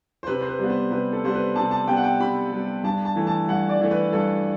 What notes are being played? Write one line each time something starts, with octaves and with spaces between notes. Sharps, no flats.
C5
C3 B4
C5
B4
G3 B3
C5
C3 B4
A4
G3 B3 C5
B4
C3 A5
A5
G3 B3 G5
F#5
G5
C3 B5
G3 B3
G2 A5
A5
E3 A3
A5
G2 F#5
D5
E3 A3
B4
G2 A4